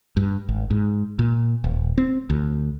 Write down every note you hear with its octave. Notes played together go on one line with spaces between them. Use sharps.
G2
G#1
G#2
A#2
D#1
C4
D2